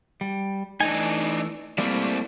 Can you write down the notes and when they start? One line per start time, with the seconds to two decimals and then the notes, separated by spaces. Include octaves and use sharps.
0.21 G3
0.81 E3 A3 D4 D#4 G#5
1.78 G3 A3 A#3 C4 E4 D5